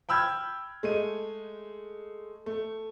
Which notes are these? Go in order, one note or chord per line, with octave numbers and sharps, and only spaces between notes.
G5 B5 E6 F6 G6 G#6
G#3 A3 D#7
A3